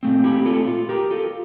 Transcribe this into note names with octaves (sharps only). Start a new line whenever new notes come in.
A#2 A3 C4
E4 G4
F4 A4
F4
G4 A#4
F4 A4